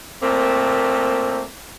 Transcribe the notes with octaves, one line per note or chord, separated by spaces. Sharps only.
A#2 A3 A#3 C4